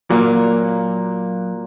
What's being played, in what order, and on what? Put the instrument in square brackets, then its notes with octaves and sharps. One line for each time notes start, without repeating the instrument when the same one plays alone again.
[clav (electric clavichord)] A#2 [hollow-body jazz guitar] F#3 [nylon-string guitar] A#3 F5